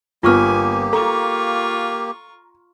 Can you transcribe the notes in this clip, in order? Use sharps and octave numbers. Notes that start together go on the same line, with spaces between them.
G1 A#3 B3 F4 G4 G#5 C#6 F6
F4 A4 A#5 C#6